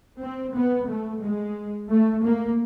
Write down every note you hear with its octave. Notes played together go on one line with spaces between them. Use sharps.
C4
B3
A3
G#3
A3
A#3